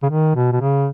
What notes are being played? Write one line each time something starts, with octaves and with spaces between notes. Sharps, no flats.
C#3
D#3
B2
B2
C#3